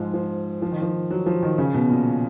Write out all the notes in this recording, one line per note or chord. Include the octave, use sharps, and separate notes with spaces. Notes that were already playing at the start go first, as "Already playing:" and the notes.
Already playing: G#2 F3
F3
F3
D#3
F3
F#3
F3
D#3
C#3
B2
A#2